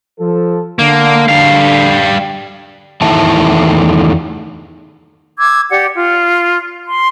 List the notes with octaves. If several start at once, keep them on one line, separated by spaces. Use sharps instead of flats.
F3 A4
D3 A#3
D3 G3 F5
E2 D#3 A3 E4 E5 A5
D6 E6 G#6
G4 D5 F#5
F4
C6